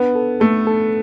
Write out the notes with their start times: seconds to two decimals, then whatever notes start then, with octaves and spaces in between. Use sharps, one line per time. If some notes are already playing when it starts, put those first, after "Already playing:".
Already playing: B3 D4
0.15 A4
0.40 A3 A4
0.67 A4